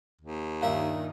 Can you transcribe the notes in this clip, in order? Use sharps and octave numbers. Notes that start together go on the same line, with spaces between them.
D#2
G2 A#2 D#3 D#4 A#4 E5 F5 A#5